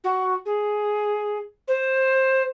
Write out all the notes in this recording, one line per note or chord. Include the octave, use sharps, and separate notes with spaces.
F#4
G#4
C5